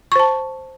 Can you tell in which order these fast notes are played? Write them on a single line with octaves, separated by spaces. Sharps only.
C#6 C5 A5